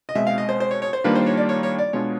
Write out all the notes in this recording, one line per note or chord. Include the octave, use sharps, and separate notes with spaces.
D#5
B2 G#3 C4 E5
F5
D#5
C5
C5
C#5
C#5
C5
D#3 G3 A#3 D4 F4 B4
C5
C#5
D5
C#5
C#5
D5
B2 G#3 B3 D4 F4 C#5